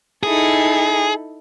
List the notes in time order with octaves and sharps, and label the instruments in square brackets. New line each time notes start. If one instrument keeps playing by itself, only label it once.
[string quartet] D#4 E4 A4 [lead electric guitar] G#4